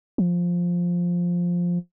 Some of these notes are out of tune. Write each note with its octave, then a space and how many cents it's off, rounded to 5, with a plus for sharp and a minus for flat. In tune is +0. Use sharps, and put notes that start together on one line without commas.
F3 +5